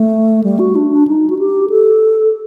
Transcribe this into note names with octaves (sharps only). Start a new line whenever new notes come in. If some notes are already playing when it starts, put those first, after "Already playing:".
Already playing: A3
G3
F#4
D4
D4
D#4
F#4
G4
A4